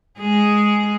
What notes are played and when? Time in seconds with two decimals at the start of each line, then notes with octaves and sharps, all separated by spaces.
0.19 G#3 G#4